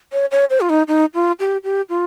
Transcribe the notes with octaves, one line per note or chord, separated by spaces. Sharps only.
C#5
C#5
C5
F4
D#4
D#4
F4
G4
G4
F4